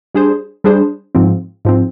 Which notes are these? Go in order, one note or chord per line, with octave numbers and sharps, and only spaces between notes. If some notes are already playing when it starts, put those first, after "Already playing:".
G3 D4 G#4 C5
G3 D4 G#4 C5
G#2 F3 C4
G#2 F3 C4